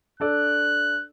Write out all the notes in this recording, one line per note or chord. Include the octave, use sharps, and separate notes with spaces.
D4 A4 D5 F#6